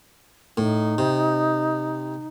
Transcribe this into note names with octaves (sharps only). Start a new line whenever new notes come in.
A2 D#4
C3